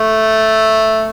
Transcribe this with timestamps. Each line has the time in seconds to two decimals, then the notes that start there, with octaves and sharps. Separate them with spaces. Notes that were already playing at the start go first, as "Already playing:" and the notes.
Already playing: A3